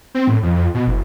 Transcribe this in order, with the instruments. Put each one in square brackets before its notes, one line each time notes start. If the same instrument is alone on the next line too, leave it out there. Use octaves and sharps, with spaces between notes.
[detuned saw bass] C4
A2
F2
F2
B2
F#1